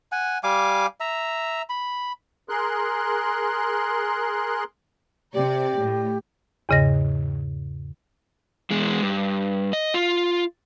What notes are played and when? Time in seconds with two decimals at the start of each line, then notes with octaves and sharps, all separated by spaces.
0.12 F#5 G#5
0.44 G3 F5 G#5 D6
1.00 E5 A#5
1.69 B5
2.49 G#4 A#4 C6 F#6
5.34 C3 G4 D5
5.80 A2
6.69 E2 G#2 C#3 D#5 A#6
8.70 E2 G#3
9.02 G2
9.73 D#5
9.94 F4